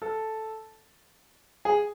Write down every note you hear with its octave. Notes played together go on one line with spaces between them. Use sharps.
A4
G#4